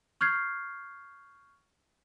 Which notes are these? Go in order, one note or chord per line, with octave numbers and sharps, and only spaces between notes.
C#6 F6 G6 G#6 C7